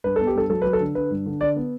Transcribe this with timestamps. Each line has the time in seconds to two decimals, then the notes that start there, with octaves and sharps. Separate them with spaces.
0.04 G2 B4
0.16 B3 A4
0.27 G4
0.34 G2 A4
0.50 F#3 A4
0.62 F#3 B4
0.73 A4
0.80 D3
0.95 D3 B4
1.11 G2
1.26 D3
1.41 D3 D5
1.56 B3